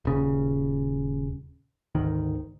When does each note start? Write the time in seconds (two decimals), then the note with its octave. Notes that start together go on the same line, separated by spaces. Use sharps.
0.05 D#1 C#3
1.95 G#1 D2 D#3